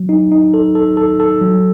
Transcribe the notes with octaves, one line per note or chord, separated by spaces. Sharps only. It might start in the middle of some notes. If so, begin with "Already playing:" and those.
Already playing: F#3
D#4
D#4
A4
A4
A4
A4
F#3